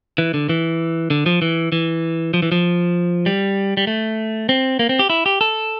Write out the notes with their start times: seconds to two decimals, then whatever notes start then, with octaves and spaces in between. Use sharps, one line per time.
0.18 E3
0.34 D3
0.49 E3
1.10 D3
1.26 F3
1.42 E3
1.72 E3
2.34 F3
2.42 E3
2.52 F3
3.26 G3
3.77 G3
3.87 A3
4.49 C4
4.79 A#3
4.89 C4
4.99 G4
5.10 E4
5.26 G4
5.41 A4